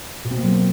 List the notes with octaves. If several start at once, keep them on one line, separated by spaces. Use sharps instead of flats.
B2
C4
A#3
F#3